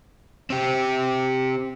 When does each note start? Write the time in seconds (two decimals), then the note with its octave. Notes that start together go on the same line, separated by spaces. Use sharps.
0.50 C4 G4